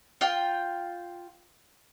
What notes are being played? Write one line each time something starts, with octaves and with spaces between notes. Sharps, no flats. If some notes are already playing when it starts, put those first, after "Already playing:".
F4 G5